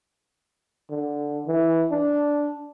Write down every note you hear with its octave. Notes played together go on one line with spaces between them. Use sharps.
D3
E3
D4